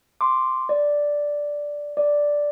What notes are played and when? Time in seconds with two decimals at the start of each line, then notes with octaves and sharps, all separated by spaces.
0.21 C6 D6
0.69 D5
1.97 D5